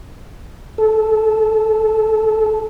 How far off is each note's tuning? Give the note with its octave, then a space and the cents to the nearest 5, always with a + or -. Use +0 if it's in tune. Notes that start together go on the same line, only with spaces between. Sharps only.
A4 -15